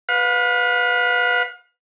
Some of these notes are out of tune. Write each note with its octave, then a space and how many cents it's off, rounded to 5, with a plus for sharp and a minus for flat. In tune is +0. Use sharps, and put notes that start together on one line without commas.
B4 +0 F5 +35